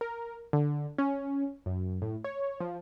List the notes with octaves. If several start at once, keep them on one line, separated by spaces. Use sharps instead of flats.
A#4
D3
C#4
F#2
A2
C#5
F3